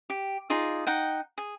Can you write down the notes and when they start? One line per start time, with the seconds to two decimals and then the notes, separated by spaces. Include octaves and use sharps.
0.10 G4
0.50 D#4 F4 G#4 D5
0.87 D#4 F#5 G5
1.38 G#4